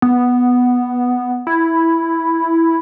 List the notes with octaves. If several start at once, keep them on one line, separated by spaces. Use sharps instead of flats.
B3
E4